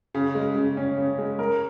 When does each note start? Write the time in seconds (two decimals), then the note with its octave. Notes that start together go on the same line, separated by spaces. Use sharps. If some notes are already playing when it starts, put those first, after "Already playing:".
0.15 C#3
0.35 G#3
0.56 C#3
0.77 C#4
0.97 C#3
1.18 G#3
1.39 A#4